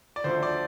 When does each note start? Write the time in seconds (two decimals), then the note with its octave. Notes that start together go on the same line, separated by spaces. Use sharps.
0.16 D5
0.24 D2 D3 F3 C5
0.43 D5